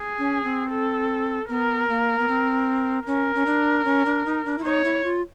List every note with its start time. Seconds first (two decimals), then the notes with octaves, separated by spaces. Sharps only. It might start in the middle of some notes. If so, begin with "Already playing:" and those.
Already playing: G#4
0.19 C#4
0.44 C4
0.70 A4
1.49 B3 A#4
1.89 A#3
2.19 B3
2.28 C4
3.07 C#4 A#4
3.35 C#4
3.46 D4
3.85 C#4
4.06 D4
4.26 D#4
4.45 D4
4.58 E4
4.64 D#4 C#5
4.84 E4
5.04 F4